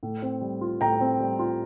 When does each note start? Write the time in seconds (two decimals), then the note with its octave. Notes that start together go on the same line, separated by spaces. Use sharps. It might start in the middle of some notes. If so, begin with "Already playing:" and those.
0.03 A2
0.22 C4
0.41 G3
0.61 F4
0.81 A2 G5 A#5
1.00 C4
1.20 G3
1.39 F4